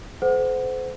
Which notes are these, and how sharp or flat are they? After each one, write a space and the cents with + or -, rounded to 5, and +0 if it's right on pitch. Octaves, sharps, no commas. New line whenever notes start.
A4 -35 C5 -30 F#5 +0